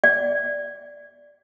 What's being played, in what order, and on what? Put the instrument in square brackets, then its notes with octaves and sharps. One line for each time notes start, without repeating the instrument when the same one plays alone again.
[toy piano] D5